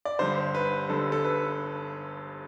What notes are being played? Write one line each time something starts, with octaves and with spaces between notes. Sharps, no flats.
D5
G1 G2 D3 C5
B4
G1 G2 D3 A4
A4
B4